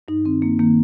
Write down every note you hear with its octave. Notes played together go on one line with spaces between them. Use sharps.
G2 D#4
D#3 C4
G2 A#3
D#3 A#3